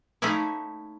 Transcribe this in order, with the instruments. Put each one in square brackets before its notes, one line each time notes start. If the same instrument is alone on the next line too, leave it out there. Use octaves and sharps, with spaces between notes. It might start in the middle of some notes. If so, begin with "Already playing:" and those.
[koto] A3 A#3 C#4 D#4 E4